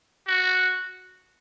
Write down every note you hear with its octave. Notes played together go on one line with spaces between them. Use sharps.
F#4